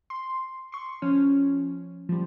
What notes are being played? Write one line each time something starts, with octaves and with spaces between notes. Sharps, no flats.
C6
C6 C#6
F3 C#4
F3 G3